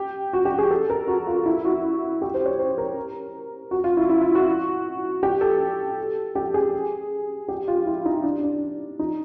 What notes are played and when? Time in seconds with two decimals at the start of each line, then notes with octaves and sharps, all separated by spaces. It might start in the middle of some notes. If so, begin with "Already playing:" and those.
Already playing: G4
0.33 F#4
0.45 G4
0.58 G#4
0.71 A4
0.90 A#4
1.08 F#4
1.27 F4
1.46 E4
1.65 F#4
2.22 G4
2.34 C5
2.46 C#5
2.59 C5
2.78 A#4
3.71 F#4
3.84 F4
3.97 E4
4.09 E4
4.21 F4
4.35 F#4
5.23 G4
5.41 A4
6.35 G4
6.54 G#4
7.48 G4
7.68 F4
7.86 E4
8.05 D#4
8.23 D4
8.43 D4
8.99 D#4